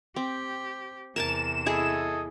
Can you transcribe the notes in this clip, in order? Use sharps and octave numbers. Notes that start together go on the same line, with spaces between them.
C4 G4
E2 C3 A#4 G#5 A5 E7
E4 G#4 A4 D#5 G#5